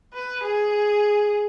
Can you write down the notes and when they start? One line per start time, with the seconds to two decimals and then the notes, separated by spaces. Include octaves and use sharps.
0.14 B4
0.43 G#4